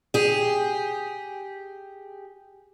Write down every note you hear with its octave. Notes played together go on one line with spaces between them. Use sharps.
G4 G#4